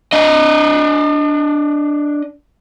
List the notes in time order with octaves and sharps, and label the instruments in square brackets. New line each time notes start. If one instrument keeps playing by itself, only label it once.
[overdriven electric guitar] D4 D#5